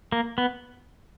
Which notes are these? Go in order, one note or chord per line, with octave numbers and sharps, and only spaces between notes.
A#3
B3